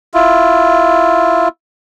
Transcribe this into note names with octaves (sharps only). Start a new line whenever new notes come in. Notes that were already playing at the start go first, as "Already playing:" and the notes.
E4 F4